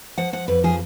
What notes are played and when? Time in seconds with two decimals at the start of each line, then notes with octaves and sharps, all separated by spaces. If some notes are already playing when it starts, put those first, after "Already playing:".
0.18 F3 F#5
0.33 F3 F#5
0.48 F2 B4
0.64 F3 G#4